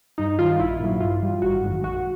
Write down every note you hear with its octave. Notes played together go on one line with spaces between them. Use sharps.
G2 D#4
D#3 G3 F4
A#1 E4
A#2 F#3
G2 F4
E3 G3
G#1 F#4
F#2 D#3 G#3
A#1 F#4